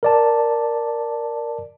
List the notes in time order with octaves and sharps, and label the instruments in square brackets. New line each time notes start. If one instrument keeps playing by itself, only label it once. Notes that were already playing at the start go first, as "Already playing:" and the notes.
[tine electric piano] A#4 D5 A5